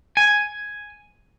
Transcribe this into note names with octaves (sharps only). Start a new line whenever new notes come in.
G#5